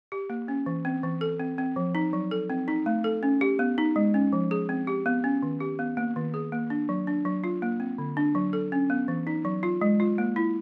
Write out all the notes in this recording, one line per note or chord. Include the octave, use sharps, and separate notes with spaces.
G4
A#3
C#4
E3
C4
E3
A4
C4
C4
F3
D#4
F#3
A4
C4
D#4
A3
A4
C#4
G4
B3
D#4
G#3
C#4
F3
G#4
C4
G4
B3
C#4
D#3
G4
B3
A#3
D#3
G#4
A#3
D4
F#3
D4
F#3
F4
A#3
C4
D3
D4
F#3
A4
C#4
B3
E3
D#4
F#3
F4
G#3
F4
A#3
E4